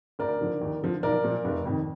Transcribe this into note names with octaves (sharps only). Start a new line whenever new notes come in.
D2 A#4 D5
D3 F3
D#2
D3 F3
B1 A#4 D5
A#2 F3
F1
F2 D#3